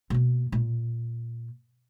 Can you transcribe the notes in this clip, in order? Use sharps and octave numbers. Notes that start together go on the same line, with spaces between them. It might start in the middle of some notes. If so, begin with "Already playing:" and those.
B2 A#3
A#2